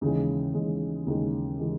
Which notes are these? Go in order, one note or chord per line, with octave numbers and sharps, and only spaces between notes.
D#2 C#3 E3 G#3
D#2 C#3 E3 G#3
D#2 C#3 E3 G#3
C#3 E3 G#3